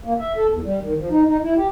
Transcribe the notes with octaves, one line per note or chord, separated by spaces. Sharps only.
A#3
E5
A4
E2
G3
D#3
F3
D#4
D#4
E4
G4